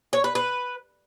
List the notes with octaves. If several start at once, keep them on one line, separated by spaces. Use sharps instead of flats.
C#5
B4
B4